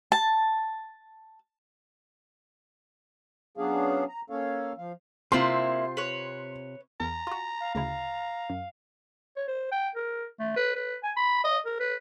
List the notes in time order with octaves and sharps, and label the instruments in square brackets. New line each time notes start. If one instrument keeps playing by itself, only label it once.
[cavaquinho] A5
[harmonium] F#3 B3 C#4 D4 G#4 F5
A#5
A#3 C#4 A4 C#5 F5
F3 F5
[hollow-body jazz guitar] C3 C4 F4 [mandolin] A#3 E4 [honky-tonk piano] C6
[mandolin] B4 C#5
[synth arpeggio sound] E2 [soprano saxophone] A#5
[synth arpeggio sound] F4 F#4
[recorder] F5
[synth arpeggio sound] D2 C#3 E4 [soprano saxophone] A#5
[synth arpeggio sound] F#2
[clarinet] C#5
C5
G5
A#4
A3
B4
B4
G#5
B5
D#5
A#4
B4